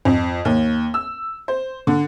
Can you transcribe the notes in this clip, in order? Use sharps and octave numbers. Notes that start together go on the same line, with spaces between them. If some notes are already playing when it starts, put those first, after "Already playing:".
F2
D#2
E6
C5
D3